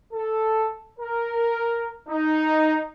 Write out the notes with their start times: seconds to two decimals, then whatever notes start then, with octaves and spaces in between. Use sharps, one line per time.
0.14 A4
0.99 A#4
2.08 D#4